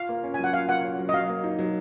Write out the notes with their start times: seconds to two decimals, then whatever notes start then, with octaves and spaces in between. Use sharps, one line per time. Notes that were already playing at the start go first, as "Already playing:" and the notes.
Already playing: F4 F5
0.09 A#3
0.23 C#4
0.34 F#3 G#5
0.44 F#5
0.53 F4 F5
0.69 A#3 F#5
0.84 C#4
0.99 F#3
1.09 D#5
1.13 F#3 F5
1.29 A#3
1.44 D#4
1.59 F#3